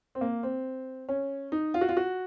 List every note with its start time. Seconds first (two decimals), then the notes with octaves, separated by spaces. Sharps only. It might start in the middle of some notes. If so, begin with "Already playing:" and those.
0.15 C4
0.21 A#3
0.43 C4
1.09 C#4
1.52 D#4
1.74 F4
1.81 F#4
1.89 F4
1.97 F#4